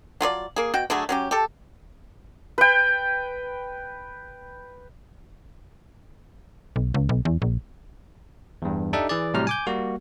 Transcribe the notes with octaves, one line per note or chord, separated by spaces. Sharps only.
F#3 F4 G#4 D5
A#3 G#4
B2 F#4 G5
D3 F#3 A3 G#4
F#3 C#4 G4
G4 A4
B4 G5
B1
C#2
B1
E2
A#1
E2 G2
D4 D#4 G4 A4 D5 E5
E3 G#4 D5
A2 C3 F#3 G3 A#5 F6
G#5 D6 G6
G3 A#3 F#4